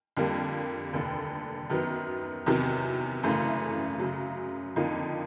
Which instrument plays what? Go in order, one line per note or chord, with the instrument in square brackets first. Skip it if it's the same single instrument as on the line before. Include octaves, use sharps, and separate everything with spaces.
[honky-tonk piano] F2 D3 G3 A#3
F1 D#2 D3
F#2 D#3 F#3 B3
E2 C3 D#3 F#3
G#1 F#2 C#3 E3 A3
F#2 C#3 F#3
F2 D3 F3 A#3 D#4